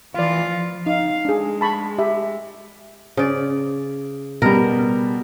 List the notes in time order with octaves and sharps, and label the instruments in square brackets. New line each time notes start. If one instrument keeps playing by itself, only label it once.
[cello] E3 F4 [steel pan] D5 F5
[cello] F3
[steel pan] D#4 [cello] F5
[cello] G#3 [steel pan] D4 G#4
[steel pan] A5 B5 C#6
G4 E5
[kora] C#3 D5
[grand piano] B2 G3 [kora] A#4